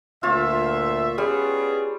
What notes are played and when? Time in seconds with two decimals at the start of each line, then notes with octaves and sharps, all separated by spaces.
0.23 D2 A#2 F4 C#5 E5 F5
1.18 G3 B3 C#4 G#4